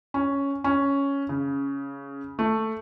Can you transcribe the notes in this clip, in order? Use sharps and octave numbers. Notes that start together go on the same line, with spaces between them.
C#4
C#4
C#3
A3